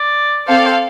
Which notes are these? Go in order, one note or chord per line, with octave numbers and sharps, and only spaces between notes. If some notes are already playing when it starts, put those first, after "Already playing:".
Already playing: D5
C4 A4 C5 F5
D5
C5